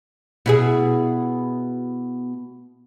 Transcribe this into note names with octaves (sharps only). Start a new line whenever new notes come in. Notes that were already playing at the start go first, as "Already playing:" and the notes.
B2 E4 G#4